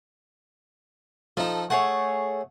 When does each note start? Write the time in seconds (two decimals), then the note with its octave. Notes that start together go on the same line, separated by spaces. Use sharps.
1.37 F3 D#4 A4
1.70 A3 G#4 C#5 F#5